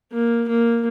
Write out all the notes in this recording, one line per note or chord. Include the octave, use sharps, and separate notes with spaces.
A#3
A#3